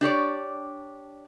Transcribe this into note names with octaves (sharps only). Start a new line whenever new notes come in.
D4 G4 C#5 D5